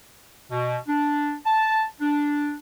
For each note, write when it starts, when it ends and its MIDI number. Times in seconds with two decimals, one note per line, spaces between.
0.51 0.78 47
0.88 1.36 62
1.46 1.83 81
2.01 2.54 62